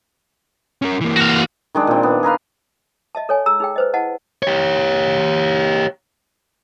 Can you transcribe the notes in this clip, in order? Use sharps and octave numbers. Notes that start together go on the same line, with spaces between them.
C#4 A#4
E3 A#3
F#4 F5
D#3 G#3 D4
A#2 C4
B3
G#4 A#4 B4 F5
D#5 E5 A5
A4 C#5 G#5
G#4 A#5 E6
D#4 G#4 G5
B4 C5 D#5
E4 D#5 F#5 A5
G4 C#5